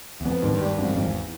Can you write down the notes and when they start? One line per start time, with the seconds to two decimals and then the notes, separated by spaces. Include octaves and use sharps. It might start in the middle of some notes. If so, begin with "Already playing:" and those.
0.21 E2
0.25 F2 B3
0.43 D#2
0.52 G2
0.61 G3
0.78 G#1 F#2
0.93 G#1 F2
1.04 E2